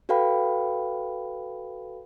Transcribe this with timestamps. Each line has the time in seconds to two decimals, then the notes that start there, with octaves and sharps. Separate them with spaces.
0.09 F#4 A4 B4 F5 G5 B5